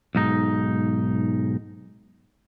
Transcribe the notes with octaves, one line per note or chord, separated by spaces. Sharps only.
B1 G#2 D#4